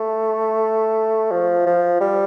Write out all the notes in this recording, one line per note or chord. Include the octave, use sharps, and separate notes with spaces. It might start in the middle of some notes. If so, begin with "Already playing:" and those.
Already playing: A3
F3
F3
G3